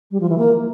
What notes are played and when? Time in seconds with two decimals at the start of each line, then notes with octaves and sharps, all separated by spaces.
0.11 G3
0.20 F3
0.29 E3
0.38 A#3